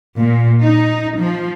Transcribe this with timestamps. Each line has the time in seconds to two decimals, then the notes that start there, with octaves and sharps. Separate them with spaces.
0.18 A#2
0.62 D#4
1.19 F3